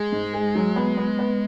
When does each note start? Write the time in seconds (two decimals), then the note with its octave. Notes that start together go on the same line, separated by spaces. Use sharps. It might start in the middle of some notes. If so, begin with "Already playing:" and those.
Already playing: G#3 G#4
0.12 G#2
0.33 G#4
0.55 F#3
0.76 B3
0.97 B3
1.19 B3